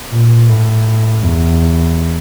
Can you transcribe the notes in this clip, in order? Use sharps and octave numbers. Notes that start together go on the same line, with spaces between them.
A#2
A2
E2